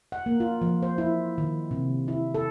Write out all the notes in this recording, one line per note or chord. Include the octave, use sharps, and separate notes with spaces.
F#5
A#3
F4
F3
C5
E4
D#3
C3
E4
A4